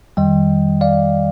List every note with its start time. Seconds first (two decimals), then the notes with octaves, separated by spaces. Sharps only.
0.17 F2 D#3 G3 D#5 G5
0.81 D5 F5